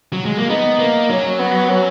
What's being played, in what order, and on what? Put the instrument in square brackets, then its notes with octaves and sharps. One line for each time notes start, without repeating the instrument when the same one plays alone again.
[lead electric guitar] F#3
G#3
A#3
[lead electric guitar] B3 [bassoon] D#4
[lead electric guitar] A#3
[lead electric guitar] F#3 [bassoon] C#4
[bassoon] B3
C#4